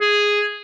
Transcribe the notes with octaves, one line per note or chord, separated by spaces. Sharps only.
G#4